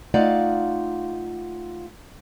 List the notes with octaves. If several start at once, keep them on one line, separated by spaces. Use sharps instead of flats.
A3 D#4 F4 D5 F5 F#5